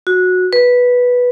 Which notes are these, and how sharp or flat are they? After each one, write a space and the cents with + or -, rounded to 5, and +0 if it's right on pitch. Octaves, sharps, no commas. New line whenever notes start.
F#4 -15
B4 -5